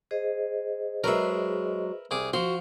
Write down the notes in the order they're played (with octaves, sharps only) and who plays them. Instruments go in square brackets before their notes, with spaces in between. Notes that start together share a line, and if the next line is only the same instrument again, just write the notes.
[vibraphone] G#4 C5 D#5
[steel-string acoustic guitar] F#3 G#3 [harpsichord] A#4 B4 E5
[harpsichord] C2 G#4 D6
[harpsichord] F3 C6 [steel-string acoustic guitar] F#4